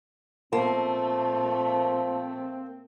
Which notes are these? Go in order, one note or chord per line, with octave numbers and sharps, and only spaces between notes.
A#2 F3 A3 A#3 C4